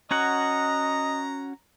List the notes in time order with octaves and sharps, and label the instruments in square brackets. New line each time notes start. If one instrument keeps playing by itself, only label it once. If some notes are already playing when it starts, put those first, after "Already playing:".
[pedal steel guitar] C#4 F#4 F#5 [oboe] D#5 [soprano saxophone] A#5